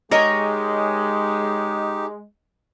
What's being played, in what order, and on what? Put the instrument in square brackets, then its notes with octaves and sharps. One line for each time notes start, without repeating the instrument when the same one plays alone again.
[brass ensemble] G#3 [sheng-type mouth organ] D#4 G4 [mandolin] A#4 C#5 [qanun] D#5 G#5